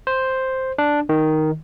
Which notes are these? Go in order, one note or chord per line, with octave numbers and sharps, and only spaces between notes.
C5
D4
D#3